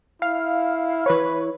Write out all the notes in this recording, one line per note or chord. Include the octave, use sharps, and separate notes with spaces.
E4 F5
E3 B4 C#5